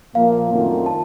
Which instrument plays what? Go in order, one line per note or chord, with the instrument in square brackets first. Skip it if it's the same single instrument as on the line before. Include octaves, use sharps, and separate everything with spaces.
[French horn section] A#2 F3 A#3 [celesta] F5
[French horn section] F#2 D#3 A3 C4 F4
[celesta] A5